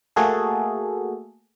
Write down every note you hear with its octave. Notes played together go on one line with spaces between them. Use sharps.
A3 A#3 F#4 G#4 A4